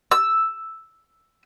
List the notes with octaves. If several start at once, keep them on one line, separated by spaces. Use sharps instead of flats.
E6